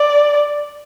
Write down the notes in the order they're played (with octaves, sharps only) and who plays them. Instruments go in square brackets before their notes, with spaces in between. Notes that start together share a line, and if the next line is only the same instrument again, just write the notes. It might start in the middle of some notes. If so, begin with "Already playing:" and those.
Already playing: [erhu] D5